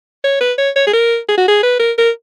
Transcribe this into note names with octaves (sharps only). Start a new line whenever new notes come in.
C#5
B4
C#5
C#5
G#4
A#4
G#4
F#4
G#4
B4
A#4
A#4